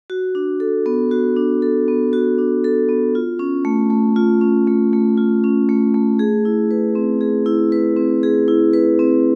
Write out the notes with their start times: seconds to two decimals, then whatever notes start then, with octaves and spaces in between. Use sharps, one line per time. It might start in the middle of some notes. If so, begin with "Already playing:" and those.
0.10 F#4
0.35 D4
0.60 A4
0.86 B3
1.11 F#4
1.36 D4
1.62 A4
1.88 B3
2.13 F#4
2.39 D4
2.64 A4
2.89 B3
3.15 F4
3.39 C#4
3.65 A3
3.90 A3
4.16 F4
4.41 C#4
4.67 A3
4.93 A3
5.18 F4
5.44 C#4
5.69 A3
5.94 A3
6.19 G#4
6.45 E4
6.71 B4
6.95 C4
7.21 G#4
7.46 E4
7.72 B4
7.97 C4
8.23 G#4
8.48 E4
8.73 B4
8.99 C4